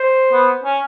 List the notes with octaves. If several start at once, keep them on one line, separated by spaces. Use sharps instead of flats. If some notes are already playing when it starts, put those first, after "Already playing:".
Already playing: C5
B3
C#4